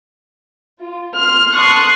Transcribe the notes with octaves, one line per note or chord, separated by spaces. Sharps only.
F4
C6 F6
A5 C6 C#6 D#6 F#6 C7